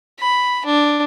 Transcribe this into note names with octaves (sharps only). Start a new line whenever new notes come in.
B5
D4